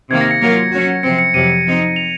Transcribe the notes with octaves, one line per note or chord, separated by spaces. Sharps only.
C3 D#3 A#3 G#6
A#6
C#7
F#3 A#3 F4 A#4
F#3 C#4 F#4
C3 F3 C4 C#7
C#7
F2 C3 F#3 D#7
C#7
F3 C4 D#4
C#7
F7